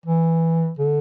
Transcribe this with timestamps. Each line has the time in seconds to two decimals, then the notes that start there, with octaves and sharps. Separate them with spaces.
0.06 E3
0.79 D3